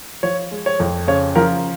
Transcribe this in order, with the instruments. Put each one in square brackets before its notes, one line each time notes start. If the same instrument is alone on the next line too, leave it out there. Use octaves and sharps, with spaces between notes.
[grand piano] F3 C#5
G#3
C#5
F2
C#3 C#5
F3 A#4